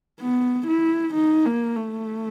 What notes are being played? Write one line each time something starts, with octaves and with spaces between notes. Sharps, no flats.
B3
E4
D#4
A#3
A3